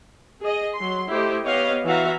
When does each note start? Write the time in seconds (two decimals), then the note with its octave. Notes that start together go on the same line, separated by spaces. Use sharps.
0.41 G#4 D#5
0.76 F#3 C6
1.10 A3 E4 G4 C5 D#5
1.43 B3 G4 C#5 D#5 F5
1.86 E3 F#4 E5 F5 A#5